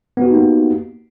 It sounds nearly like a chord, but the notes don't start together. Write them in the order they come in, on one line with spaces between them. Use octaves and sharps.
B3 F#4 G4 D#4 A#3